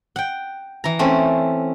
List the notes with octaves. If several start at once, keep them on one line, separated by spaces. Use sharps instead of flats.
F#5 G5
E3 A#5
A3 C4 C#4